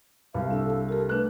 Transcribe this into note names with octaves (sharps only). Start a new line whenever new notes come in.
C2 F5
D4 A4 F5
A5
G4 A4 A#4
A3 D4 B4 F#6